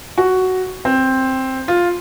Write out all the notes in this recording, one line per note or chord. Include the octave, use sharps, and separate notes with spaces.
F#4
C4
F4